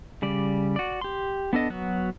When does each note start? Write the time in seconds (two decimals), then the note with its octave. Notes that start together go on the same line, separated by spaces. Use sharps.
0.22 C#3 G3 D5
0.76 F#4 D5
1.01 G4 C6
1.53 B3 D4 A4 D#5
1.70 F#3 B3 F#4